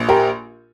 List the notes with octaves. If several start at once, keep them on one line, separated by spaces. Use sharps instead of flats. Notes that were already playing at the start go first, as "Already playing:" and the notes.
Already playing: A#1
G4 A#4